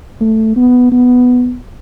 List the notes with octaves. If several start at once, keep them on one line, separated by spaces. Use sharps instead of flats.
A3
B3
B3